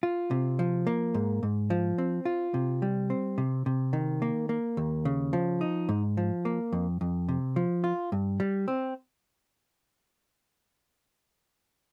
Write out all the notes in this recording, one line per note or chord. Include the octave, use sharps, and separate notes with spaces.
F4
C3
F3
A#3
G#2
G#2
F3
C4
F4
C3
G3
C4
C3
C3
D#3
A#3
A#3
D#2
C#3
F3
D#4
G#2
F3
A#3
F2
F2
C3
F3
F4
G2
G3
C4